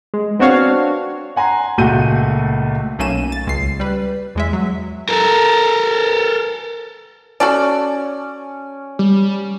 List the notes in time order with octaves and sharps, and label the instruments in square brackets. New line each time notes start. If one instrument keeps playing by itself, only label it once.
[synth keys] G#3
B3 C4 D4 F#4 C#5 F5
[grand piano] F#5 G#5 A#5 C6
C#2 A#2 A3 F#4 G6 D#7
[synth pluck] B1 A3 A#3 C#4 D#7 E7
A6
C#2 C7
G3 B4
E2 G#3 E5
F#3
[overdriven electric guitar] A4 A#4
[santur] C#4 [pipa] F#4 A4 D5
[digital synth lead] G3